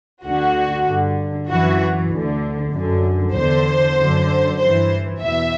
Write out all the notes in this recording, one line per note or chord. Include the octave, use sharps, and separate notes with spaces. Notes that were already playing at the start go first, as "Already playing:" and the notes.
D2 D3 F#4
G2 D3
F#2 E3 F#4
D2 D3
F#2 D3
E2 D3 C5
F#2 D3
G2 E3 C5
E2 B2 E5